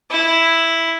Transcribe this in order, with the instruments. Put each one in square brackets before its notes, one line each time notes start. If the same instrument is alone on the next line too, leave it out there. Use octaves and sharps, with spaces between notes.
[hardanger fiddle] E4